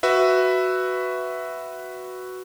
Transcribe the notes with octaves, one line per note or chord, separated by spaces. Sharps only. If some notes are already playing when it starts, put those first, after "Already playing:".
F#4 B4 E5